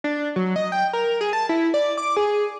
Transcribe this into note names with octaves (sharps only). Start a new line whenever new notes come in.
D4
F#3
D#5
G5
A#4
G#4
A5
E4
D5
D6
G#4